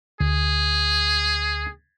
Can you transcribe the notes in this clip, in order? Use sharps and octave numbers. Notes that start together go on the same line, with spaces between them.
D2 G#4